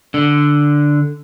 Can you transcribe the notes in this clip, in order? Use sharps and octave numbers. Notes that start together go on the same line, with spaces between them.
D3